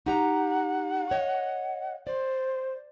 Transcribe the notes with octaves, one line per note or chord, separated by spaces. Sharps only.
D#4 G4 F#5 A#5
C#5 D#5
C5 D5